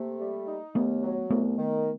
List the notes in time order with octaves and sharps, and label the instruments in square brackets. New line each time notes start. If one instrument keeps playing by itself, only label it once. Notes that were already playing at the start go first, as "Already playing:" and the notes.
Already playing: [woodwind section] C3 A3 [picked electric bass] A#3
[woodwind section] G3
D#4
[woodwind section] D#2 [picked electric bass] A3 B3
[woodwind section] F#3
[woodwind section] C2 [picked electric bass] A3 B3
[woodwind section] D#3